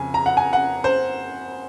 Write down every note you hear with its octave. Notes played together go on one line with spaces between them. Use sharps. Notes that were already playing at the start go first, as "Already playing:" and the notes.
Already playing: F2 C#3 G#5
A#5
F#5
G#5
F#5
C5